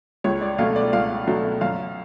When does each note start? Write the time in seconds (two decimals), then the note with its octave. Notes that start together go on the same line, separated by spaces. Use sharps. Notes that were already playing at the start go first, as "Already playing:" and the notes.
0.24 C#2 C#5
0.42 D5
0.58 B2 F#3 A3 F5
0.76 D5
0.93 C#2 F5
1.27 B2 F#3 A3
1.61 F#2 F5